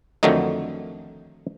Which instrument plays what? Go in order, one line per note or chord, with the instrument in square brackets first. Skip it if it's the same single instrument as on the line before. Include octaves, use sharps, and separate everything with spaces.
[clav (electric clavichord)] F2 D3 D#3 F#3 A3 D#4